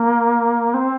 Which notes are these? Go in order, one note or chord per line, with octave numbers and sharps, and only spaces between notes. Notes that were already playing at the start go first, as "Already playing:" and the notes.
Already playing: A#3
C4